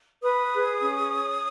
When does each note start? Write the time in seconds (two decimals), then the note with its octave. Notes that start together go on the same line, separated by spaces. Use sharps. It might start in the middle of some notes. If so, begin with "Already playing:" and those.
0.22 B4 D#6
0.52 G#4
0.80 C#4
1.10 C#5